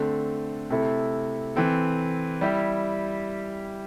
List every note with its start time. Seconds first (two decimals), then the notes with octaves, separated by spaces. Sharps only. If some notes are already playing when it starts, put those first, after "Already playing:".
Already playing: D3 A3 C4
0.70 C3 A3 E4 A4
1.56 E3 C4 A4
2.41 G3 E4 G4